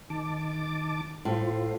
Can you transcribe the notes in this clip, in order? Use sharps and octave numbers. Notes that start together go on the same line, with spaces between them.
D#3 A5 D6
A2 F4 C5